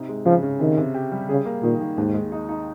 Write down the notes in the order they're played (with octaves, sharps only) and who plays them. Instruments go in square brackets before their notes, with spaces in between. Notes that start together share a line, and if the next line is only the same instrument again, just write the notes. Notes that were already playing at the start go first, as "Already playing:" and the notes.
Already playing: [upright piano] C3 D#4
G#3
[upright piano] C#3 [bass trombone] F3
[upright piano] C#3
[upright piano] C3 [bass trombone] D#3
[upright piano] C3
G4
G3
[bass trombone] C#3 [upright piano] G#4
[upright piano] A#3
[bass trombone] A#2 [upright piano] D#3
[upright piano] D#3
[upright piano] D#2 [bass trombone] G#2
[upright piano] G#3
D#4
D#4